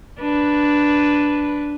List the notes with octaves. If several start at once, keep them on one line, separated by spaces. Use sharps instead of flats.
D4 B4